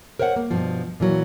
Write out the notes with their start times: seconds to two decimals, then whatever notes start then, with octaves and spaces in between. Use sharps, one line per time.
0.19 A#4 C5 C#5 F5 F#5
0.36 A#3
0.51 G2 B2 F3
1.00 A#2 E3 F#3